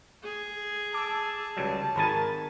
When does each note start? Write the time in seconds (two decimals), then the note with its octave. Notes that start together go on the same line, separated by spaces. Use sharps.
0.23 G#4
0.94 A5 D6 E6
1.57 C#2 F#3 G3
1.96 G#1 D#3 A#4 G#5 B5 A6